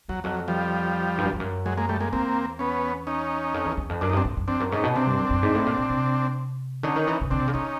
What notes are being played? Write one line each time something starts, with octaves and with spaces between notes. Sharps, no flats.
E2 F#3
F2 F#3
F3 G3
G2
F#2
F2
F#2
F#3 G#3
G#3 A#3
G3 A3
G#3 A#3
E2 A#3 C4
B3 C#4
C#4 D#4
F2
E2
E2
F2
F#2 D4
D#4
G2 C4 D4
G#2
F#2
F2 C4 D4
F#2
G#2 C#4 D#4
B2
C3 C4 D4
G2
F#2
F#2
G#2
A2
A#2
A#2
C3
D3 C#4 D#4
D#3
E3
C#3
D3 C4 D4
C3
C#3
D3 C#4 D#4